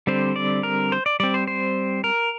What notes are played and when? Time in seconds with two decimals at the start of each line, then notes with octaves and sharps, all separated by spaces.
0.07 D3 G3 C4 C5
0.36 D5
0.63 A#4
0.92 C5
1.06 D5
1.20 G3 C4 D5
1.34 C5
1.47 C5
2.04 A#4